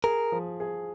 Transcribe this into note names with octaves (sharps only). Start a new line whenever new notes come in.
G#4 A#4
F3
G#4